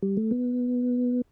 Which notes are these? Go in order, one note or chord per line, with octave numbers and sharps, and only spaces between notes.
G3
A3
B3